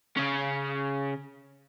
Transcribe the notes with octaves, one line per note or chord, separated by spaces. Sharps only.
C#3 C#4